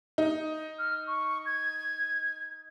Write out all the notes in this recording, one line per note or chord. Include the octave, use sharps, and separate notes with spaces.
D#4
F6
C#6
G#6